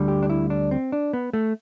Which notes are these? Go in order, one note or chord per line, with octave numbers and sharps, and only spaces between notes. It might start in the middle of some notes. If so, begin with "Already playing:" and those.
Already playing: D2 D3 G3
G4
D4
E4
D4
C4
D4
B3
A3